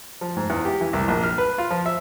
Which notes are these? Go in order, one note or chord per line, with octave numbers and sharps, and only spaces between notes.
F3
G#2
E2
G4
E3
C2
A#1
F6
B4
F4
F3
E5